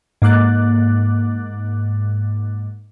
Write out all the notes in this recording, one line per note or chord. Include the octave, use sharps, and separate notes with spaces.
G#2 A#3 D6 F#6 A6